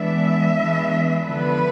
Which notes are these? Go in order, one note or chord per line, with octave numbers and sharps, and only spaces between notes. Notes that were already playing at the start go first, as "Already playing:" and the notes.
Already playing: E3 G#3 B3 D4 E5
E3 G#3 B3 D4
D3 F3 B3 D4 B4